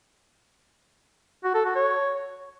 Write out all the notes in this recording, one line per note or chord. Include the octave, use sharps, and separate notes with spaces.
F#4
A4
F#4
C#5